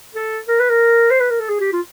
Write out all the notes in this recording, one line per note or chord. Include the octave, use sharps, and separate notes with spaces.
A4
A#4
B4
A#4
C5
B4
A#4
A4
G#4
G4
F4